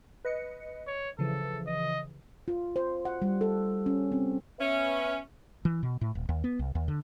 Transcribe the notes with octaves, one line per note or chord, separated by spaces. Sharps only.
B4 D#5 C#7
C#5
C#3 E3 F3 A4
D#5
F4
C5
F#5
G3
A4
C#4
C4
B3 C#4 B4 E5
E3
B2
A2
D#1
D#2
B3
C2
D#2
D3